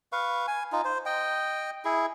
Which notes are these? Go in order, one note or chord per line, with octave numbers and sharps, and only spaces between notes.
B4 F5 C#6
G#5
D#4 F4
C5
D#5 G5
E4 G#4